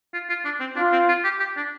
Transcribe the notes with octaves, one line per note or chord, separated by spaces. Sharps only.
F4
F4
D4
C4
D4 F4
C4
F4
G4
G4
D4